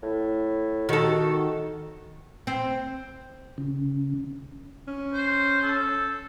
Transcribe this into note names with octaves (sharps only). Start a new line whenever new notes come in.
A2
D#3 F#4 A4
C4
C#3
C#4
C5
A4